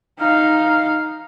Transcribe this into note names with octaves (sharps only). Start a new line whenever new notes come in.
D#4 F5